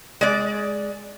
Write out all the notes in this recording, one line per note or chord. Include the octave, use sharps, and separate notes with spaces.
G#3 D5